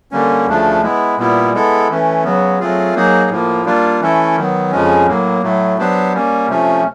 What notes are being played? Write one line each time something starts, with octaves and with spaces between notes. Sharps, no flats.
D3 G3 A#3 C#4
D2 C#3 F3 A3 D4
G#3 B3 E4
A#2 G3 B3 E4
G#3 B3 E4 A4
E3 A3 C#4
C#3 F#3 B3
F#3 A3 C4 F4 G#4
F#3 A#3 D#4 G#4
A2 F3 A#3
G3 A#3 D4 F4
E3 A3 C#4 E4 A4
D#3 F#3 B3
F2 C#3 F3 G#3 C#4
A2 F#3 A#3
A2 F#3 A3
F#3 B3 D4 G4 C5
G3 A#3 C#4
C3 F3 A3 C#4